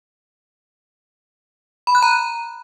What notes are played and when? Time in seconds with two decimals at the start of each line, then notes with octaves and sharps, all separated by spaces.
1.87 B5
1.95 F#6
2.02 A#5